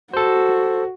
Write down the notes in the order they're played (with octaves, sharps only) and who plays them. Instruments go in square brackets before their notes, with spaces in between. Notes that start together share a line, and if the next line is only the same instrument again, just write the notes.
[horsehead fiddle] F#4 [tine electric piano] A4 C5